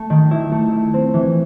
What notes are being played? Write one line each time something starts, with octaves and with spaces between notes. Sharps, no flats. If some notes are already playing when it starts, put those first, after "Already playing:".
Already playing: A3
D#3
E4
A3
E4
C4
E3